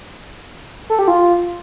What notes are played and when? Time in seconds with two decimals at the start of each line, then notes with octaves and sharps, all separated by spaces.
0.90 A4
0.99 G4
1.08 F4